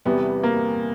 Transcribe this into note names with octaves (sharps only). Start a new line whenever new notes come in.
E2 C3 E3 G3 B3
A#3